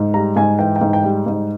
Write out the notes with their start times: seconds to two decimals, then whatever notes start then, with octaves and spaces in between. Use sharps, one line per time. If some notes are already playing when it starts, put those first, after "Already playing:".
Already playing: G#2
0.14 G3 A#5
0.36 G#2 G#5
0.59 E3 G5
0.76 G5
0.81 G#2
0.93 G5
1.04 G3
1.26 G#2